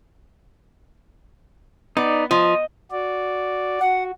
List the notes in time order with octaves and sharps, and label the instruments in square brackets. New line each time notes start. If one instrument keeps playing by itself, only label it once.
[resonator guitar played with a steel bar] B3 [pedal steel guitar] D#4 D5
[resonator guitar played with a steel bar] F3 [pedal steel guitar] D#5
[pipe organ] F#4 D5
[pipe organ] F#4 [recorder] F#5